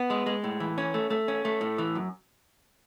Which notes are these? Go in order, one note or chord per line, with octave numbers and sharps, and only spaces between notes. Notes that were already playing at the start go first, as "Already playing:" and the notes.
Already playing: B3
G#3
G#3
A2
E3
C#4
A3
A3
C#4
A3
A2
E3
F#2